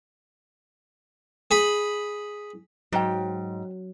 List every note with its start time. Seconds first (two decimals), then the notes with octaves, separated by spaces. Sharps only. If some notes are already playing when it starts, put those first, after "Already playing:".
1.51 G#4 B5
2.93 G#2 F#3 C5 G5